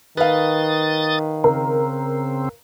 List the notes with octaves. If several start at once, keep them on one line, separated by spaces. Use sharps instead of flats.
D#3 B4 F5 D#6 A6
C#3 C4 A#4